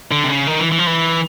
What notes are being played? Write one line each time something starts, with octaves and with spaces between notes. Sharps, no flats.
D3
C3
C#3
D#3
E3
E3
F3
E3